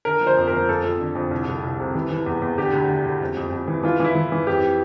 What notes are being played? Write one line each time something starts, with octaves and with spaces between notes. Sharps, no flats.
D3 A#4
F3
C5
F2
A#4
F3
F2 A4
F2
D3
F2
C2
C2
C2
C3
E3
E3
E2
E2
D3 G4
D2
D3
D2
F2
F2
F2
E3
E3 F4
E3 E4
E3
E3
F2 G4